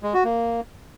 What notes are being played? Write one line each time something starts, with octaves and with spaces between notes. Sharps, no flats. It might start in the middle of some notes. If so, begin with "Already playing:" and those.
G#3
F#4
A#3